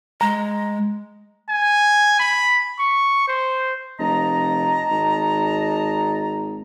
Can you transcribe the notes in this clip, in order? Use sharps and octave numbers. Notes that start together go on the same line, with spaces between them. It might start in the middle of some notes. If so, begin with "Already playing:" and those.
G#3 A#5
G#5
B5
C#6
C5
F1 D#5 A5 A#5
G#1